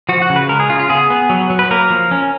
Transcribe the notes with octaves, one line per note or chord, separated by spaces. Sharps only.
F3 F#4
F#4
C#3
B4
G#3 A#4
G#4
C#3 F4
F4
B3 G#4
B3
F#3
F#3
B4
A#3 A#4
F3
C#4